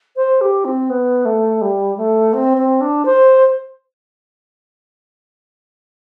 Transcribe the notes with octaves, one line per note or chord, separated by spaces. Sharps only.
C5
G4
C4
B3
A3
G3
A3
C4
C4
D4
C5